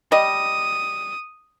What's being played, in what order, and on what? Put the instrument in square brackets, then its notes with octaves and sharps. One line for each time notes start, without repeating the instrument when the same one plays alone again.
[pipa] G3 D#5 [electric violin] D#6